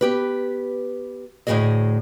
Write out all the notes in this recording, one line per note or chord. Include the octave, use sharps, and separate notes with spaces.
B3 G4 B4
D2 A2 C3 G#3 G#4 D#5